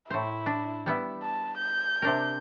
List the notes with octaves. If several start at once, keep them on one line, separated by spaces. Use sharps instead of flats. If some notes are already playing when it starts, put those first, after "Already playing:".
A2 E4 C5
D4
G3 B3 E4
A5
G6
C3 D4 A#4